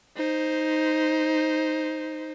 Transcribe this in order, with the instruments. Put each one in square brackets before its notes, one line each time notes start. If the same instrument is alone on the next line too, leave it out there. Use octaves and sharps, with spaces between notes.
[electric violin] D#4 C5